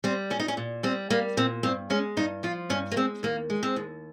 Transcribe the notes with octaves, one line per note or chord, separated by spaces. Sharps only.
G3 C4
A#2 C#4
D#4
C#4
A#2
G3 C4
G3 A#3
A#2 C4
G2 C4
G#3 C#4
G2 D#4
F3 F4
G2 C#4
A#3
G#3 C4
D#2 A#3
G#3
C4
D#2